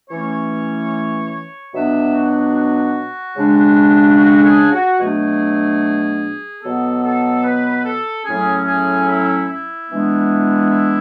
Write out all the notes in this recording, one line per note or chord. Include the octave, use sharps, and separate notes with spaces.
E3 A3 C#4 C#5
B2 F#3 B3 D4 E5
F#4
F#4
C#3 G#3 D4
F#4
A4
G#4
F#4
B2 F#3 A3 D4 G#4
B2 F#3 B3 A4
A4
B4
A4
A2 F#3 C#4 G#4
G#4
E4
E4
E3 G#3 B3 D4
E4